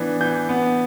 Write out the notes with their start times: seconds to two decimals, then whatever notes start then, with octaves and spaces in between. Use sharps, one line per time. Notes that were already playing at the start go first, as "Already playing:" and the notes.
Already playing: E3 B3 D4
0.20 E3 G6
0.49 B3